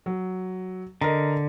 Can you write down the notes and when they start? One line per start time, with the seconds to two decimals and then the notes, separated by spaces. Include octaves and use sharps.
0.06 F#3
1.01 D3 A#4 D#5 A#5